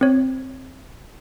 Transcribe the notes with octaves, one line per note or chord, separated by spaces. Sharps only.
C4 C#5